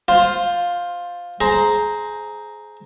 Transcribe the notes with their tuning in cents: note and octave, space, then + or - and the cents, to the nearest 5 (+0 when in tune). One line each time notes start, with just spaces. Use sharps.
F4 +10 C5 +0
G#4 +20 C5 +0 A#5 +0